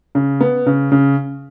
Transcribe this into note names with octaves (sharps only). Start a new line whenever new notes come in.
C#3
B3
C#3
C#3